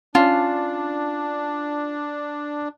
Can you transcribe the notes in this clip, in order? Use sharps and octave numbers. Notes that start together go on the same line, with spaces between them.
C#4 D4 F4 A5